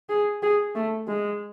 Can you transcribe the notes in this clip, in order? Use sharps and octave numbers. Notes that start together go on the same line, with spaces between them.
G#4
G#4
A3
G#3